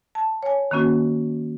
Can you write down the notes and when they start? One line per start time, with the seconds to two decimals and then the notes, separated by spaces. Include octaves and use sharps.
0.15 A5
0.43 C#5 G#5
0.71 D#3 A#3 C#4 F#4